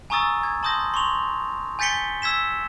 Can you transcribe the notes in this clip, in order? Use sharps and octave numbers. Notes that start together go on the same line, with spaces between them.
G#5 A#5 C#6 D#6 E6 A6
G#6
A5 C6 D#6 G6 A#6
C6 C#6 F7
G#5 G6 A6 B6 C#7 G7
E6 G#6 B6 E7